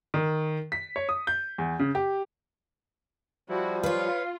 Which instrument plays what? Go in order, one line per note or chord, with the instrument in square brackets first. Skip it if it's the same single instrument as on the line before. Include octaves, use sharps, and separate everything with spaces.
[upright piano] D#3
B6
C#5
D#6
G6
E2
C#3
G4
[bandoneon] F3 G3 [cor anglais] E4 [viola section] F#4
[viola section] F4 [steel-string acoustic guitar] B4 C#5 [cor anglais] F5